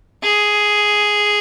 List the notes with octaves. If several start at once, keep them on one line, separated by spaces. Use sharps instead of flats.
G#4